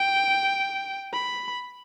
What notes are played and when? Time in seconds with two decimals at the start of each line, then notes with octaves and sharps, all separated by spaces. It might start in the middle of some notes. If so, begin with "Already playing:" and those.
Already playing: G5
1.13 B5